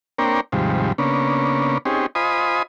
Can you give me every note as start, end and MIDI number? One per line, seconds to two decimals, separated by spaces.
0.18 0.41 58
0.18 0.41 60
0.18 0.41 62
0.18 0.41 70
0.18 0.41 73
0.18 0.41 79
0.52 0.92 39
0.52 0.92 44
0.52 0.92 48
0.52 0.92 53
0.52 0.92 55
0.98 1.78 49
0.98 1.78 58
0.98 1.78 59
0.98 1.78 61
0.98 1.78 62
1.85 2.06 60
1.85 2.06 61
1.85 2.06 63
1.85 2.06 67
1.85 2.06 68
2.15 2.63 65
2.15 2.63 72
2.15 2.63 75
2.15 2.63 80
2.15 2.63 83
2.15 2.63 87